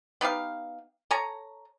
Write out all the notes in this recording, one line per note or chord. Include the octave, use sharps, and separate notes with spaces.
B3 D#4 G4 F5
A4 C#5 G#5 A#5